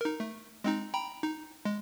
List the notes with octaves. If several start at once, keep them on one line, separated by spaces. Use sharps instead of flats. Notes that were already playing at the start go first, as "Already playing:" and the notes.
D#4 A#4
A3
G#3 C4 D#4
G5 A#5 B5
D#4
G#3